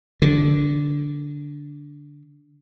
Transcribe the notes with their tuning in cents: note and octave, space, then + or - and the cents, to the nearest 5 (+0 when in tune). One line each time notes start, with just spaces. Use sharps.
D3 -10